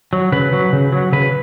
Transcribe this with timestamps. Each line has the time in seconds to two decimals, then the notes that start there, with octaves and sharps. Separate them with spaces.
0.13 F#3
0.32 C#3 B4
0.53 F#3
0.73 C#3
0.92 F#3
1.12 C#3 B4